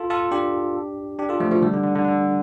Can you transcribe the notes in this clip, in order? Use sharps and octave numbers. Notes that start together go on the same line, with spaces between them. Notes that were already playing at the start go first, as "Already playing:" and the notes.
Already playing: F4 A4
F4 A4
D4 G4
D4 G4
F4 A4
F3 A3
F3 A3
D3 G3
D3
D3
D3
D3